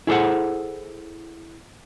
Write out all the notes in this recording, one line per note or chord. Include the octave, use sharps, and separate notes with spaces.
E4 G#4 A4 C5 F#5